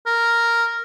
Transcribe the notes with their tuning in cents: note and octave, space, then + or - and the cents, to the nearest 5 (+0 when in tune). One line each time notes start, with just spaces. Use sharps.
A#4 -5